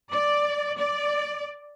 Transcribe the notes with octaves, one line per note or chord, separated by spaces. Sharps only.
D5
D5